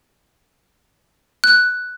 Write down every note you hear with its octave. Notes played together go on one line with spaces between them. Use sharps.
F#6